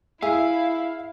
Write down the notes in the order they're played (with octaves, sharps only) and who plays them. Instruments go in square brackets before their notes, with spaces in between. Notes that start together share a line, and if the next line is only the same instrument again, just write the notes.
[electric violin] E4 [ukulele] G#4 [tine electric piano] E5 [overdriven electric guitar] F5